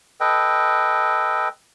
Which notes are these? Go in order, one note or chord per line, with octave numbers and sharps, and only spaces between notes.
A4 B4 D#5 G5